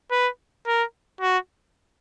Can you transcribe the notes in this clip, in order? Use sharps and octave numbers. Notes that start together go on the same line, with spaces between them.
B4
A#4
F#4